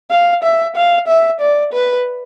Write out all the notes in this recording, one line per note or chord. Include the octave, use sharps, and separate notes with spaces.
F5
E5
F5
E5
D5
B4